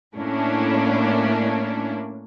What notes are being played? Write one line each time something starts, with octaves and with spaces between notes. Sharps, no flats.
A2 A#3 C#4 D4 E4